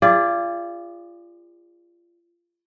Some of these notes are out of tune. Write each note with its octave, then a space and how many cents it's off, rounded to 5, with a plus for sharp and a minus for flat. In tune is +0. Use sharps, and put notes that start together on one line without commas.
F4 -25 G#4 -40 D5 +0